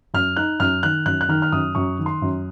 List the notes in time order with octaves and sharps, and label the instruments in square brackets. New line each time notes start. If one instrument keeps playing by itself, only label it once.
[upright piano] F#2 [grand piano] F6
[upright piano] D#4 [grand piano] F#6
[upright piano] F#2 [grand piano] F6
[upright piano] D#3 [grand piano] F#6
[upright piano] F#2 [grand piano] F#6
[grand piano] F#6
[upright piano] D#3 [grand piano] F6
[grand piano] F6
[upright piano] F#2 [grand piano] D#6
[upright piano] F#2 [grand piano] C#6
[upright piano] D#3
[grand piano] C6
[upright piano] F#2